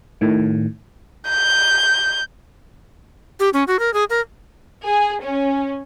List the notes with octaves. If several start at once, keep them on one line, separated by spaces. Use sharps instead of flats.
A2 D#3
G6
G4
C#4
F#4
A#4
G#4
A#4
G#4
C#4